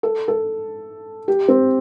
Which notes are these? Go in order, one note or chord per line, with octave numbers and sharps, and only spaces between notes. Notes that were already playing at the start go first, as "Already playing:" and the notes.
A4
A4
G4
C4